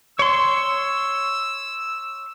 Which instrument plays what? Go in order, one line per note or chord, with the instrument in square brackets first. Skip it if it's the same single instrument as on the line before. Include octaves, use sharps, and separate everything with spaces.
[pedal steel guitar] C#5 C6 [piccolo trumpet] E6